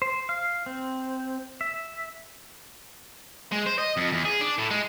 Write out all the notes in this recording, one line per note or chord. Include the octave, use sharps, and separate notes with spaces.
C5
F5
C4
E5
G#3
C5
D#5
F2
E2
G#4
D4
A2
G#3